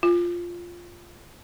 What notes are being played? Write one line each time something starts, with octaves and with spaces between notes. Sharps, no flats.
F4